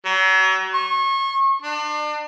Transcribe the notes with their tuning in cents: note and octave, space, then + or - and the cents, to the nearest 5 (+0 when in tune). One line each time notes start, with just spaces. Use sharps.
F#3 +35
C#6 -30
D4 +35